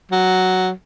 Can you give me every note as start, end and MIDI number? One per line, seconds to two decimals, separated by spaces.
0.12 0.71 54